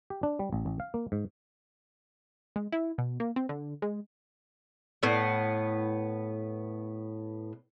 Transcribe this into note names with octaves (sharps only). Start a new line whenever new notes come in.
G4
D4
G3
A1
A1
F5
A#3
G#2
G#3
E4
B2
A#3
C4
D3
G#3
A2 B3